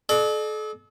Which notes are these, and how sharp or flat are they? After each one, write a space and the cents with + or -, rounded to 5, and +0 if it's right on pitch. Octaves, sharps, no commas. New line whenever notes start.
A4 -40 D5 +45